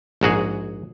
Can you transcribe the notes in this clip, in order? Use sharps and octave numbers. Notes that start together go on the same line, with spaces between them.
A#1 G#2 F#4 G#4